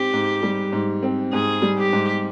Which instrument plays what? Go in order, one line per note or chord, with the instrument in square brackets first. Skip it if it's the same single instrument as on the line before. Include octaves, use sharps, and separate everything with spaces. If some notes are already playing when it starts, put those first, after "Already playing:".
Already playing: [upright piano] G#2 C4 [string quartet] G4
[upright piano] G#2
G3
G#2
C4
[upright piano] G#2 [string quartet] G#4
[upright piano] G3
[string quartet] G4
[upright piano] G#2